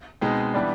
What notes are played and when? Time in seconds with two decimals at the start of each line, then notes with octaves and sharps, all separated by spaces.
0.21 B2 G#3 C4 D#4
0.54 E3 G3 B3 D4